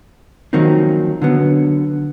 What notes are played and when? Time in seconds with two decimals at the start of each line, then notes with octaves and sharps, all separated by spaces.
0.53 D#3 F3 F#3 A#3 C4 D#4
1.22 D3 F#3 B3